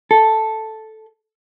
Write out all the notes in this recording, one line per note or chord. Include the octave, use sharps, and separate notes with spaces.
A4